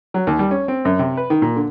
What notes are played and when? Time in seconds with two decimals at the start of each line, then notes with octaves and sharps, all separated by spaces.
0.14 F#3
0.27 D#2
0.39 G3
0.51 C#4
0.68 C4
0.85 F#2
0.99 C3
1.17 B4
1.30 D#3
1.42 A#2
1.56 D3